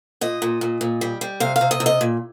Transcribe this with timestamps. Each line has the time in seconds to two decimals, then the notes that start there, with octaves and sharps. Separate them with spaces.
0.21 A#2 D#5
0.42 A#2
0.61 A#2
0.81 A#2
1.01 G3
1.21 G3
1.40 C3 F5
1.56 F5
1.61 C3
1.71 D#5
1.80 C3
1.86 D#5
2.01 A#2